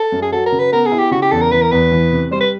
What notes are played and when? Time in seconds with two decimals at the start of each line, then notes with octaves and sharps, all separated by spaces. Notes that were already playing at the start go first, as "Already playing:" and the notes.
Already playing: A4
0.12 F#2
0.22 G#4
0.32 F#3 A4
0.46 A#4
0.52 C#3
0.59 B4
0.72 B3 A#4
0.86 G#4
0.92 E4
0.98 G4
1.11 C#3 F#4
1.22 G4
1.31 E2 A4
1.41 A#4
1.51 E3 B4
1.62 A#4
1.72 E2 B4
1.92 E3
2.11 C3
2.31 G3 C5
2.40 B4